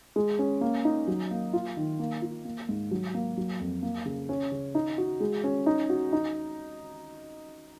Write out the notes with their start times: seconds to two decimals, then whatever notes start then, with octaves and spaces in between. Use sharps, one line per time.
0.16 G#3
0.39 C#4
0.61 A#3
0.85 D#4
1.08 F#3
1.31 A#3
1.53 F4
1.77 D#3
1.99 A#3
2.22 F4
2.45 A#3
2.69 G#2
2.91 F#3
3.14 A#3
3.37 F#3
3.60 F2
3.83 A#3
4.05 C#3
4.29 C#4
4.52 C#3
4.75 D#4
4.98 F#4
5.20 G#3
5.44 C#4
5.66 D#4
5.90 F#4
6.13 D#4